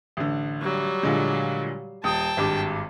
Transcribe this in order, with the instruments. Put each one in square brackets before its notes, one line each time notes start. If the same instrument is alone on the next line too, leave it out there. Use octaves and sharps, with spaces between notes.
[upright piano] A1 D3
[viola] F#3 G3
[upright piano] A#2 D3 G#3
[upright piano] D#1 D#6 [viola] G5 A5
[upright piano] G#1 G2 D6